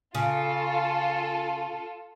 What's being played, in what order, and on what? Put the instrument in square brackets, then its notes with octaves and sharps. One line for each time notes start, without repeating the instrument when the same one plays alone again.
[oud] C#3 [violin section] F4 A4